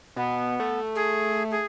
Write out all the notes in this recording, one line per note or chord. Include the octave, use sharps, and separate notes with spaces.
B2 B3
A3
G#4
G#4